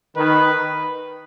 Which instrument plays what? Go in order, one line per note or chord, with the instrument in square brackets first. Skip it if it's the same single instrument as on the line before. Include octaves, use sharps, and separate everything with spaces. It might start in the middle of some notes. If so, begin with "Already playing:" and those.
[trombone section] D#3 [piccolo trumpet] B4